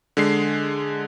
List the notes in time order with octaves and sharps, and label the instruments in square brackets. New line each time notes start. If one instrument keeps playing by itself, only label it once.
[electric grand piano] D3 G#3 C7